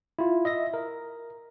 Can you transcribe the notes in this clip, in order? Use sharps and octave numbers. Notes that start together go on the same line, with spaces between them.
E4 F4
D#5 E5 A#6
A#4